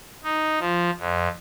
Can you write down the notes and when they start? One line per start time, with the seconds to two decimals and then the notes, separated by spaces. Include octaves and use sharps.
0.23 D#4
0.60 F3
0.98 F2